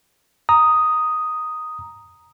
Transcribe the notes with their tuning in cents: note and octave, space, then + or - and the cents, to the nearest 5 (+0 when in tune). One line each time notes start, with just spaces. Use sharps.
A#5 +0 D#6 +0